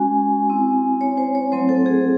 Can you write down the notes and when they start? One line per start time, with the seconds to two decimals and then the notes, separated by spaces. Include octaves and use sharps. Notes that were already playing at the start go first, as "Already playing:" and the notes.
Already playing: G#3 C#4 F#4 G#5
0.50 C4 E4
1.01 C#5
1.17 C5
1.35 C#5
1.52 F#3 A3 C4 E4 C5
1.69 A4
1.86 G#4